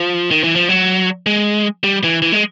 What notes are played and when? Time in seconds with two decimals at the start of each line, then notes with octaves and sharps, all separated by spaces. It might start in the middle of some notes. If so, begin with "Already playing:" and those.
Already playing: F3
0.31 D#3
0.44 E3
0.56 F3
0.69 F#3
1.26 G#3
1.84 G3
2.04 E3
2.22 E3
2.32 G#3